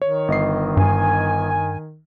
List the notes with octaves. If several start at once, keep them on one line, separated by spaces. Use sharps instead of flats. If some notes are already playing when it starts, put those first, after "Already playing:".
D#3 C#5
G1 D#5 C7
G2 G#5